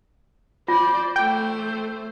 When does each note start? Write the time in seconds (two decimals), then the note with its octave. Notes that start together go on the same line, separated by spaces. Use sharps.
0.68 F4 C5 D5
1.16 A3 C5 G5